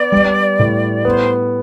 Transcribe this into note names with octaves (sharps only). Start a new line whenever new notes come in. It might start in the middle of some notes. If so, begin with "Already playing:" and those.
Already playing: B3 D5
G3
A2
B3 C5